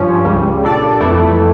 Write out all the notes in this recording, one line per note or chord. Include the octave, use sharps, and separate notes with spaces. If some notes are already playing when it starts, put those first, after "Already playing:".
Already playing: G2 F3 C#4
C#2 C#3 G3
A#2 G3 D4 A4 D5
F2 E3 A3 E4 A4